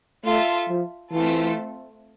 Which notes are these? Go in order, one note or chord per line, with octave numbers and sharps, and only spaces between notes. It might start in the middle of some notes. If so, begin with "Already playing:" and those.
A3 F4 A4 E5
F3
E3 A3 C4 F4 A4